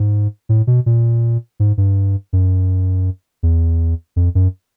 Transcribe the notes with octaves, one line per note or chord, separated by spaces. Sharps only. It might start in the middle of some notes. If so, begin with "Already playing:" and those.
Already playing: G#2
A2
B2
A#2
G#2
G2
F#2
E2
F2
F#2